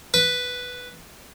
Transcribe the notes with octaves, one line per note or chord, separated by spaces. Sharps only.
B4